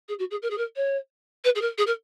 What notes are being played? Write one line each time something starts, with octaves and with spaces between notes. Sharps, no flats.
G#4
F#4
G#4
A#4
G#4
A#4
C#5
B4
G#4
A#4
G#4
A#4